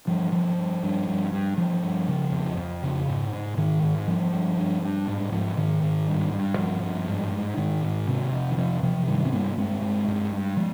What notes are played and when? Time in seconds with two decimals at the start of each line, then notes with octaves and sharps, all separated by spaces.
0.07 G2 F3
0.32 G2 F3
0.58 G2
0.83 G2
1.07 G2
1.32 G2
1.57 G2 F3
1.83 G2
2.07 C#3
2.32 F2
2.57 F2
2.83 C#3
3.08 G#2
3.33 G#2
3.57 G#2 D#3
3.83 G#2
4.08 G2 F3
4.33 G2
4.57 G2
4.83 G2
5.07 G#2
5.32 G#2 F3
5.57 G#2 D#3
5.83 G#2
6.07 G2
6.32 G2
6.58 G2 F3
6.83 G2
7.07 G#2
7.32 G#2
7.57 G#2 D#3
7.83 G#2
8.07 C3
8.32 F2
8.51 D#3
8.57 C3 F3
8.83 C3 F3
9.07 G2 D#3 G3
9.25 C4
9.32 G2 G3 A#3
9.58 G2 G#3 C4
9.82 G2
10.08 G2
10.32 G2
10.57 F3 G#3